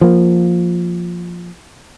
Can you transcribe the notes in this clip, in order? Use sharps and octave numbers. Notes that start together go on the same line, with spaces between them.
F3 A#3